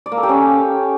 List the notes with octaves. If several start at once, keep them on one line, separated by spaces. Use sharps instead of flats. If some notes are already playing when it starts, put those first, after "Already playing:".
D5
A#3
A4
G4
C#4